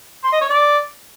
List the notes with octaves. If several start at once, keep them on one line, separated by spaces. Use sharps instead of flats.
C6
D#5
C#5
D5